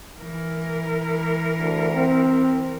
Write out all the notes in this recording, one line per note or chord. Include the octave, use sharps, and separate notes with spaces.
E3 A#4
D2
C4